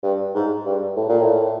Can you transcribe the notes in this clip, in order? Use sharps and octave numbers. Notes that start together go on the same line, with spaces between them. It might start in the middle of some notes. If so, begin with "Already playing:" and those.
G2
G#2
G2
A2
A#2
A2